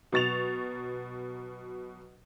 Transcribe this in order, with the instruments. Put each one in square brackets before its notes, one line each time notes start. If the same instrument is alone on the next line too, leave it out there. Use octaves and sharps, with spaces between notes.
[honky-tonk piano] B2 F#3 C#6 A6 E7 F7